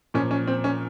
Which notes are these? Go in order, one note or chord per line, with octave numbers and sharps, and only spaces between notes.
A#2 F3 C#4
C#4
C4
C#4